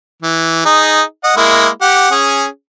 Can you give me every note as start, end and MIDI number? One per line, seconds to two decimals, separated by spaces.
0.22 0.62 52
0.65 1.02 63
0.65 1.02 68
1.24 1.35 75
1.24 1.35 78
1.37 1.68 56
1.37 1.68 58
1.37 1.68 64
1.81 2.11 67
1.81 2.11 78
2.11 2.46 61
2.11 2.46 68